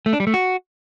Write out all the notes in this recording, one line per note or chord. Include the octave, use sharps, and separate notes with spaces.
A3
D4
G3
A3
F#4